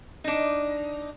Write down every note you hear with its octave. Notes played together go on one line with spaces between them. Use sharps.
D4 D#4